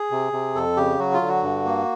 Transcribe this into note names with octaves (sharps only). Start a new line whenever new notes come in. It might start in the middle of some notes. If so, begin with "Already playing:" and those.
Already playing: G#4
C3
C3
F2 A4
C#3 G4
F#3 F#4
F4
D3
F#4
G2
A#3